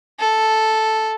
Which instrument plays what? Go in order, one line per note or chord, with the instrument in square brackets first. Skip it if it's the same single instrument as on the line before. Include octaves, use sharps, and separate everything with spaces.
[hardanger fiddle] A4